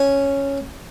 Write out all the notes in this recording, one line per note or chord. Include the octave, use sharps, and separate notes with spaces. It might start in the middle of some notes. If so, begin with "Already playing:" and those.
Already playing: C#4